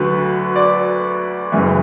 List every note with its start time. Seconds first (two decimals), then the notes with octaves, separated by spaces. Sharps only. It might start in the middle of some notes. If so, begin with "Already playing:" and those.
Already playing: D2 D3 F#3 B4
0.56 D5
1.52 F#1 F#2 E3